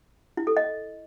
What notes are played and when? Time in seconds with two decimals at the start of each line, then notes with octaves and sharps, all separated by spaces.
0.37 E4
0.47 A4
0.57 D#5